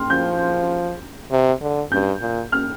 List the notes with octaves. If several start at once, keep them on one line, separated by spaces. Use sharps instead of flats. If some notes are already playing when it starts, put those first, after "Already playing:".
Already playing: G5 C6 F6
F3 G6
C3
D3
G2 G6
A#2
F6